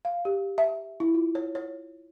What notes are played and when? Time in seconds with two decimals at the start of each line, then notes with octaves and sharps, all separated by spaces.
0.05 F5
0.25 G4
0.58 E5
1.00 E4
1.14 F4
1.35 C#5
1.55 C#5